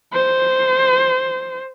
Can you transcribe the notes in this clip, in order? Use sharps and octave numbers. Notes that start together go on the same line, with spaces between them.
C5